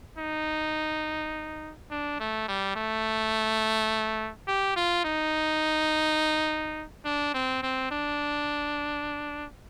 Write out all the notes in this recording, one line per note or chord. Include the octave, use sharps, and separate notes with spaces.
D#4
D4
A3
G3
A3
G4
F4
D#4
D4
C4
C4
D4